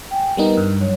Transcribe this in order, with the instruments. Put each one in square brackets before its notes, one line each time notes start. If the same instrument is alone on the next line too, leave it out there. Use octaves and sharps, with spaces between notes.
[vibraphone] G5 G#5
[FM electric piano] G3 B3 D#4 [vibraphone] A#4
[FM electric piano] G2
[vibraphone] F#3 C#5